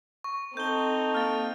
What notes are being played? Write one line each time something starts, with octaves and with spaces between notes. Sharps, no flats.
C#6
C4 D#4 A4 G6 G7
A#3 F6 A6